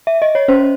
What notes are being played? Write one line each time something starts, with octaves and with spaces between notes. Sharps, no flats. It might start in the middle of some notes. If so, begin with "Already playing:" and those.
E5
D#5
C#5
C#4 C5